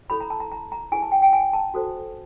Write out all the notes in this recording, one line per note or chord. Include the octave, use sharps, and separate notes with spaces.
E4 A4 C#5 B5
A#5
A5
A#5
A#5
A#5
E4 G#4 B4 G#5
A5
G5
G5
G#5
A5
F#4 A4 C5